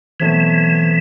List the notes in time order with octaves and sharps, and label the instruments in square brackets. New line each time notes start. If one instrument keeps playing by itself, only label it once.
[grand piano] B2 F#3 A3 C4 [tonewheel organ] E3